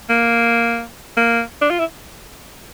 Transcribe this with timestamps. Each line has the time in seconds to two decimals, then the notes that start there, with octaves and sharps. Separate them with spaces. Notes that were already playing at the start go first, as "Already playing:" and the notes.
0.10 A#3
1.17 A#3
1.61 D4
1.70 F4
1.79 E4